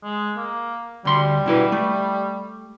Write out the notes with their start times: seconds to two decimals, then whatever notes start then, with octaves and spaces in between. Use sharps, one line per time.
0.03 G#3
0.37 A#3
1.05 D2 G3 C6
1.46 B2 E4 B4
1.72 A3